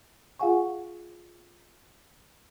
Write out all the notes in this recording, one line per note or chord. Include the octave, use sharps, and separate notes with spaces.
F4 G#4 F5 F#5 G#5 C#6